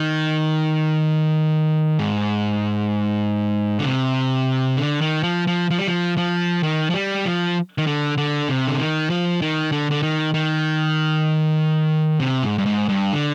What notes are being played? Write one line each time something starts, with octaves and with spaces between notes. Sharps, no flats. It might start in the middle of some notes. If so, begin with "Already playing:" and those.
Already playing: D#3
G#2
D3
C3
D3
D#3
F3
F3
F3
G3
F3
F3
D#3
F3
G3
F3
D#3
D3
D3
C3
D3
D#3
F3
D#3
D3
D3
D#3
D#3
C3
G#2
G2
G#2
G2
D3